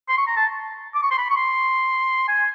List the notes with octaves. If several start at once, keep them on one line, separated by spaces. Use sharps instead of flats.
C6
C#6
A#5
A5
D6
C#6
C6
B5
C#6
C6
G#5